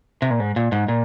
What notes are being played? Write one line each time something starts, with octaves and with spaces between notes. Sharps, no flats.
C3
A#2
G#2
A#2
G#2
A#2